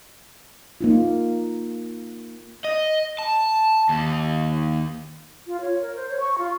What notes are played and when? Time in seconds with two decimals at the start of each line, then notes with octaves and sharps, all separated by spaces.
0.81 A#3 D#4 F4
2.64 D#5
3.19 A5
3.89 D#2
5.47 F4
5.61 C#5
5.81 A#4
5.96 C5
6.09 C#5
6.20 C#6
6.38 F4